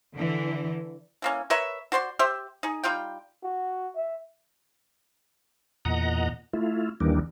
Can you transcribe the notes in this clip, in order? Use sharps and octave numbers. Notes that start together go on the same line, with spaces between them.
D3 E3
E3 A#3 C#4
A#4 B4 C#5 E5
F#4 C5 D5 C6
G4 C5 E5
D#4 G#4
G3 D#4 F4 G5
F#4
E5
E2 A#2 D#5 F#5 A#5
A3 E4 F4
D#2 D#3 E3 G3 A#3 D4